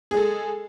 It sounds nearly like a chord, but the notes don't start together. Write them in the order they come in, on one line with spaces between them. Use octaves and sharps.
G#4 G#3 A4